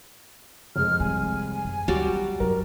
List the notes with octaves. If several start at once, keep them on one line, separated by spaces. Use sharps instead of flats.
F1 G#3 F6
G3 C4 G#5
F#2
D2 F#3 G3 F#4 D5
F#2 F#3 A#4